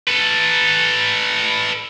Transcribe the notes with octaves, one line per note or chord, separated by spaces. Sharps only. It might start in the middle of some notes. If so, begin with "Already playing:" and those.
A4 B4